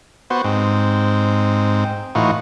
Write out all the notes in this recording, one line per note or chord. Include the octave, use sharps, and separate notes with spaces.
B3 F#4 C5
G#2 C4
A2 E3 D#4 F4 F#4